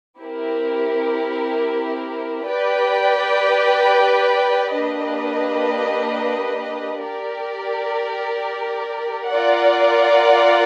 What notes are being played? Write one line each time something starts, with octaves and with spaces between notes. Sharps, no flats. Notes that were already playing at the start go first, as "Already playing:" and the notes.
C4 E4 G4 A#4
G4 B4 D5 G5
A#3 D4 G4 B4 D#5
G4 A#4 D5
F4 A#4 D5 F#5